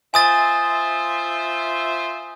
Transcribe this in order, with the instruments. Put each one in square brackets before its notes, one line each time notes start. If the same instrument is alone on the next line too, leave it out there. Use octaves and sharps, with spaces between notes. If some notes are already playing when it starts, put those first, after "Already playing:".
[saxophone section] F4 C5 E5 [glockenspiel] G#5 D#6 A6